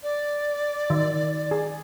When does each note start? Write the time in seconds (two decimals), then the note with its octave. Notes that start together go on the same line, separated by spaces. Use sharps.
0.03 D5
0.90 D#3
1.51 G#4